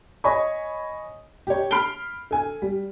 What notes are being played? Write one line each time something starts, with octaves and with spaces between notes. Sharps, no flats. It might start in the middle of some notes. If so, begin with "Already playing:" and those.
C#5 D#5 G#5 B5 C#6
G4 C#5
B5 F6 C7 D7 G7
A4 G#5
G3